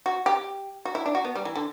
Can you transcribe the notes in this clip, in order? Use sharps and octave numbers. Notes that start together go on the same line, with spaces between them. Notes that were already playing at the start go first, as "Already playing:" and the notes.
F#4
G4
F#4
E4
D4
F#4
B3
G3
E3
D3